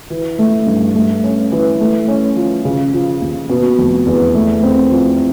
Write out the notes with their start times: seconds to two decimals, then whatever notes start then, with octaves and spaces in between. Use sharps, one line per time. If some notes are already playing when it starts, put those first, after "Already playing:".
0.10 E3
0.39 A3
0.67 G2
0.95 A3
1.24 C#4
1.52 E3
1.80 A3
2.08 C#4
2.36 F3
2.65 C#3
2.93 F3
3.21 D#2
3.50 B2
3.78 F1
4.06 E2
4.35 A3
4.63 C4
4.91 F3